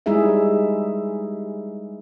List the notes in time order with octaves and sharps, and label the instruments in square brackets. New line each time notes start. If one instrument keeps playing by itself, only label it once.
[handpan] G3 G#3 D#4 E4 G#4 E5